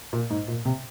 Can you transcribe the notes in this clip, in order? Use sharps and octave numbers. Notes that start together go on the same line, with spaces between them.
A#2
G#2
A#2
C3